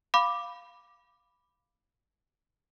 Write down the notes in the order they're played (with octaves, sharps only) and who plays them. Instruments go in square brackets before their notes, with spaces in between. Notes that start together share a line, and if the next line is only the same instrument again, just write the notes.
[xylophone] F5 B5 D6